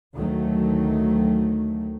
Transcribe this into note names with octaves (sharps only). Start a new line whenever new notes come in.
D2 D#3 F#3 A3